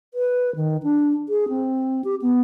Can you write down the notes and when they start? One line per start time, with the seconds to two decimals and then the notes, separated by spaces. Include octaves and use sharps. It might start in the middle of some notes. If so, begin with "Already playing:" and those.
0.14 B4
0.56 D#3
0.83 D4
1.29 G#4
1.49 C4
2.04 G4
2.22 B3